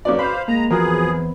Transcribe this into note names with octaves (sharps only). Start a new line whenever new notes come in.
F2 F#3 F#4 B4 D5 D6
C5 F5 B5
G#3 A#3 A#5
E2 F3 C4 F4 F#4 G#4 A#4 B4